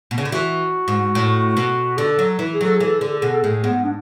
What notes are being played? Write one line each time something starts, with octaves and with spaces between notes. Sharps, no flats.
B2
C#3
D3
E3 F#4
G#2
A2
B2
D3 A4
F#3
E3
G#4
F#3 A4
G#4
E3
A4
D3 G#4
A4
B2 G#4
A4
A2 G#4
G#2 B3
D4